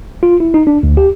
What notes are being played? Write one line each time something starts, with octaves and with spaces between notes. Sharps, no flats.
F4
E4
D#4
D4
D2
G4